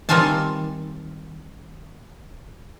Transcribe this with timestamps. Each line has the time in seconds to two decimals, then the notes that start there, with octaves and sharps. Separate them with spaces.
0.09 D#3 G3 C4 F4 G#5 A5